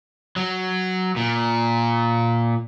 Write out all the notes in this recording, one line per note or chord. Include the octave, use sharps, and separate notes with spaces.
F#3
A#2